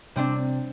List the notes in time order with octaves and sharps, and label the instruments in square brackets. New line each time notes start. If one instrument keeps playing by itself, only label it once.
[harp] C3 C4 D4